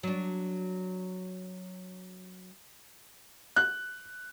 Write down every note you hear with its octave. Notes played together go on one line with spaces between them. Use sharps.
F#3 D4
F#6